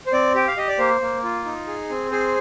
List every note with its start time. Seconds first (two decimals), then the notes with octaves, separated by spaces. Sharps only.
0.07 C5
0.13 C4 D5
0.35 G4 G5
0.48 F5
0.57 G4 D#5
0.68 D5
0.78 A#3 C5
1.01 A#3
1.23 F4
1.45 D#4
1.67 G#4
1.89 C4
2.11 G#4 C5